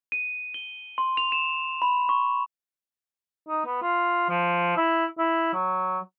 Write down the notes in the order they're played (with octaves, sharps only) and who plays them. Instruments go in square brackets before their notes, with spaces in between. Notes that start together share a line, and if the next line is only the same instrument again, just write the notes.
[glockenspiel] D#7
G7
C6
F7
E7
B5
C#6
[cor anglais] D#4
B3
F4
F3
E4
E4
F#3